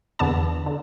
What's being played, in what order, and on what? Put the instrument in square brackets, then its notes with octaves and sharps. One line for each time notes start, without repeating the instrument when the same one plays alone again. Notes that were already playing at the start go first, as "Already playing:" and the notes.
[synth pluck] E2 D3 B3 D4 A5
D3